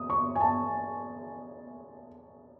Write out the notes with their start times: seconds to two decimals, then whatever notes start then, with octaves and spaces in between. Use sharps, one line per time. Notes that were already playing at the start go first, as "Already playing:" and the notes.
Already playing: D#6
0.10 C#6
0.35 G#5
0.41 A5